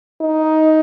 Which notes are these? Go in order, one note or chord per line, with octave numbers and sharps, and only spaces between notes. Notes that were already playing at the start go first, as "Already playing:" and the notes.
D#4